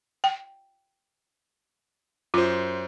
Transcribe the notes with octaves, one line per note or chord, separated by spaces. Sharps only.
G5
F#2 F4 C5